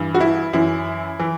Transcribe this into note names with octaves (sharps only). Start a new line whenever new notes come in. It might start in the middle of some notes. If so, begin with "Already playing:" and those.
Already playing: G2 E3
F#4
E4
F#2 E3 E4
E3